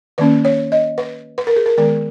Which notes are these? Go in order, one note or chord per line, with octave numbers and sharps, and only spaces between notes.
D#3 A#3 C#4 B4
C#5
D#5
B4
B4
A#4
G#4
A#4
D#3 G#3 B3 A#4